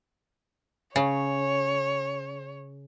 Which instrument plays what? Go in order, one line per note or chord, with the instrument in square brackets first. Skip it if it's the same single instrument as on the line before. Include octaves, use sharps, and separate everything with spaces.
[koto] C#3 [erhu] C#5